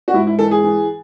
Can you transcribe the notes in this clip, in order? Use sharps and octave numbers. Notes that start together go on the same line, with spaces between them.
F#4
G#2 E4
E4
E3 A4
G#4
E3